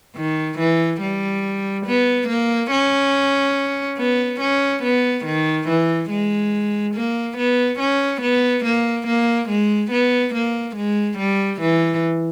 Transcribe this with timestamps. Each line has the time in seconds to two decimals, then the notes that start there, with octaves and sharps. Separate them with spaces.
0.16 D#3
0.59 E3
1.01 G3
1.86 B3
2.28 A#3
2.71 C#4
3.98 B3
4.41 C#4
4.83 B3
5.25 D#3
5.68 E3
6.10 G#3
6.95 A#3
7.37 B3
7.80 C#4
8.22 B3
8.65 A#3
9.07 A#3
9.49 G#3
9.91 B3
10.34 A#3
10.76 G#3
11.18 G3
11.61 E3